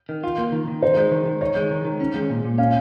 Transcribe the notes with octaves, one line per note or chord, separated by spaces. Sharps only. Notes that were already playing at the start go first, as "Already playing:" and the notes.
D#3
F4
A#3
D#3
D#3
D#4 C5
G#3
D#3
D#3
D#4 C#5
G#3
D#3
D#3
C#4
G#3
A#2
A#2
C#4 F5